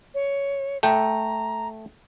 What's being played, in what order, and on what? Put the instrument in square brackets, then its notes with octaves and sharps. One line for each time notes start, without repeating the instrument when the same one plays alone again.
[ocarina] C#5
[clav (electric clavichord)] A3 G5 [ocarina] A#5